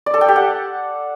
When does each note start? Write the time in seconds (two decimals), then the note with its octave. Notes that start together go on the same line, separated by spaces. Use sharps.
0.06 D5
0.14 A4
0.21 G5
0.28 G4
0.36 F#5